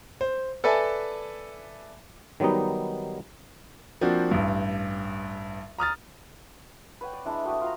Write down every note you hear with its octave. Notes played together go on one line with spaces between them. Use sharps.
C5
A4 B4 D5 E5 G#5 A5
D#3 F#3 G3 B3 D#4
F3 A#3 C4 D4 F#4
A1 G2
A#5 D#6 F6 A6
B4 C#5 F#5 G5
D5
G#3 D4 E4
A3 F#4 G5 D#6
F4 F#5 A#5